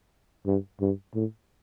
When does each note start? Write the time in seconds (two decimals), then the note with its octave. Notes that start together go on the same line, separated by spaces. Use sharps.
0.46 G2
0.81 G2
1.15 A2